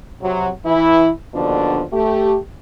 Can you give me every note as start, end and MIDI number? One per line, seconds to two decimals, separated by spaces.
0.21 0.48 48
0.21 0.48 54
0.65 1.09 52
0.65 1.09 64
1.34 1.81 39
1.34 1.81 47
1.34 1.81 50
1.34 1.81 53
1.34 1.81 62
1.92 2.36 57
1.92 2.36 67